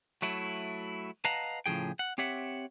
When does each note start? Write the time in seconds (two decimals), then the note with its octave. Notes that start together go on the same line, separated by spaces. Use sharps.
0.22 F#3 A3 E4
1.25 B4 D#5 F5 F#5 A5 A#5
1.66 A2 C#3 F3 G#4 G5
1.99 F#5
2.18 C4 G4 C#5 E5 F#5